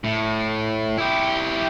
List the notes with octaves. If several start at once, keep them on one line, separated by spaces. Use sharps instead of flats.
A2
E4 G4